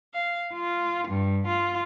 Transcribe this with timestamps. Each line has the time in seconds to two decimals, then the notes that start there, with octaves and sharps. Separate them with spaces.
0.14 F5
0.53 F4
1.07 G2
1.47 F4